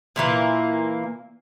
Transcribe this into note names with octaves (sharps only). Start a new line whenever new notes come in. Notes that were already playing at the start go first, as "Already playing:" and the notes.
A#2 E3 A#3